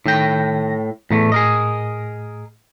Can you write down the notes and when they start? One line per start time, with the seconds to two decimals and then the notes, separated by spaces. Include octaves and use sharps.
0.06 A2 D#3 G5 A#6
1.11 E2 A2 A3
1.32 G#4 A#4 D#5